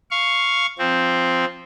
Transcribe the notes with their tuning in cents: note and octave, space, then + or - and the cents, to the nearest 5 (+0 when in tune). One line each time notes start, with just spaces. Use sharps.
F5 +0 C#6 +0
F3 +0 C4 +0